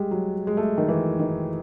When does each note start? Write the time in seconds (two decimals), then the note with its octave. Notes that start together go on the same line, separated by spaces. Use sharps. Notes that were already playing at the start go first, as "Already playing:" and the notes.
Already playing: G3 G#3
0.11 F#3
0.47 G#3
0.57 A3
0.78 D#3
0.88 E3
1.19 D#3